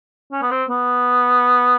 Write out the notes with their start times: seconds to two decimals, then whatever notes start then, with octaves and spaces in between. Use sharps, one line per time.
0.32 C#4
0.42 B3
0.51 C4
0.69 B3